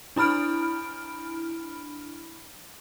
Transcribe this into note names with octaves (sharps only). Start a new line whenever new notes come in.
D4 E4 B5 F6 D7